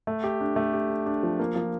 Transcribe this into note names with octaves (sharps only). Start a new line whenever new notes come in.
A3
G4
D4
A3
G4
D4
D4
F3
A#3
F3